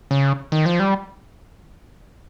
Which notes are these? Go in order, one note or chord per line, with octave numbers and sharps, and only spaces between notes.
C#3
D#3
F3
G3